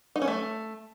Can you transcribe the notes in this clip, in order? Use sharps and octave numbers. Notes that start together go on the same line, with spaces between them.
D#4
C#4
A3